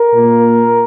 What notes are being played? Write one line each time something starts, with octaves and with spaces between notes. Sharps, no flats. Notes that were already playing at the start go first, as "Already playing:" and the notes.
Already playing: A#4
A#2 A#3